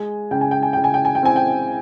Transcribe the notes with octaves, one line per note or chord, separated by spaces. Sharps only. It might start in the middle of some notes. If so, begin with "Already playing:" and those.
Already playing: G#3 G#5
C#3 G5
G#5
G5
G#5
C#3 G5
G#5
G5
G#5
G5
C4 G#5
G5